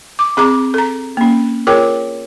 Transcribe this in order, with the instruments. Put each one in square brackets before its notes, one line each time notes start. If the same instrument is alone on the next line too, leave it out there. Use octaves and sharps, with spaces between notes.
[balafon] D6
C4 G#4 A#5 D6
A4 A#5
A#3 C#4
F4 G#4 A#4 C#5 G5 D6